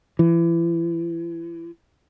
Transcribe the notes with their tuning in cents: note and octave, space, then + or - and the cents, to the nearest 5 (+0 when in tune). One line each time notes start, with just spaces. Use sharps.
E3 +35